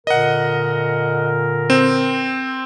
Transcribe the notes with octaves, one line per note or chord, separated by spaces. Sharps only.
A#2 D3 A#4 D#5 F#5
C4